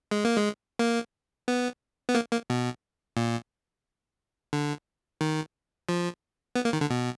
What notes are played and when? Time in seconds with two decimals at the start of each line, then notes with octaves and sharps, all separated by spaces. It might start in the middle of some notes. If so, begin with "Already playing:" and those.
0.11 G#3
0.25 A#3
0.36 G#3
0.79 A#3
1.48 B3
2.09 B3
2.15 A#3
2.32 A#3
2.50 B2
3.17 A#2
4.53 D3
5.21 D#3
5.89 F3
6.56 B3
6.65 A#3
6.73 D#3
6.81 D3
6.90 B2